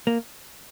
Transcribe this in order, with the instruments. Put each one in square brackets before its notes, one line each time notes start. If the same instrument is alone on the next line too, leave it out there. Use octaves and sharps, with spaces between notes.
[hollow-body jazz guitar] A#3